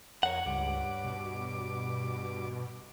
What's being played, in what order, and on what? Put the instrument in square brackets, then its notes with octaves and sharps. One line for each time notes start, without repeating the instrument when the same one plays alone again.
[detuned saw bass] F2 [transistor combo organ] A#4 [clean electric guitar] C#5 F#5
[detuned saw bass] C#2 [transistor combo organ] G2 D6
[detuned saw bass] B2